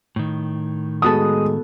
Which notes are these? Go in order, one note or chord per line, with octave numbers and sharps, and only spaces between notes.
A2 D#3
G#3 B3 F#4 A4 D#6